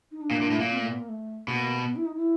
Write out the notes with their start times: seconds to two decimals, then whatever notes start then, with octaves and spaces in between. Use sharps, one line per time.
0.11 D#4
0.21 D4
0.31 A#2
0.41 A#2
0.51 A2
0.60 A#2
0.70 C4
0.80 A3
0.90 B3
0.99 A#3
1.09 A3
1.47 B2 A#3
1.86 B3
1.96 E4
2.06 D#4
2.16 E4